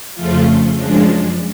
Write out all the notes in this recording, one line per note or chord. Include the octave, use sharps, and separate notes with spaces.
F2 C#3 F3 A3 F4
F#2 F3 G#3 D4